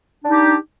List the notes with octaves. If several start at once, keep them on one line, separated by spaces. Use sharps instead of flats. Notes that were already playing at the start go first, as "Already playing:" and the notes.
D4 D#4 G4